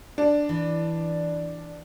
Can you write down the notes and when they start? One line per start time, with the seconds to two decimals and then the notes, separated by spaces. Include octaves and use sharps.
0.18 D4
0.49 E3